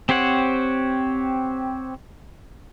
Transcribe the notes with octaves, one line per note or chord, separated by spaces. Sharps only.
C4 G4 C5 C#5 F#5